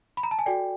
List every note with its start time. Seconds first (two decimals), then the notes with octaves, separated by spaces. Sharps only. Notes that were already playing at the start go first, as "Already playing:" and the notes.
0.17 B5
0.23 A#5
0.31 A5
0.39 G#5
0.46 F#4 A4 D5 G5